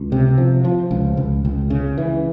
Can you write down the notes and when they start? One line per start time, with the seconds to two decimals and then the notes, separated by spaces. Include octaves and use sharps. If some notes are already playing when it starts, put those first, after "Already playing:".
Already playing: C#2
0.12 C3
0.38 F3
0.65 F3
0.91 C#2
1.17 C#2
1.45 C#2
1.70 C#3
1.98 E3